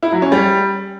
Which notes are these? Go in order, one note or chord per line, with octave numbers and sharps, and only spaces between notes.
E4
F#3
C#4
G3